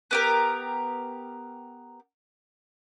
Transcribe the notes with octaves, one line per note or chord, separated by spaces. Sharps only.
B3 G4 A#4